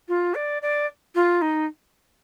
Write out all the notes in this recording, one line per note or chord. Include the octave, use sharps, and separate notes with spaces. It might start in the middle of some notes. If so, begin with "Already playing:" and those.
F4
D5
D5
F4
D#4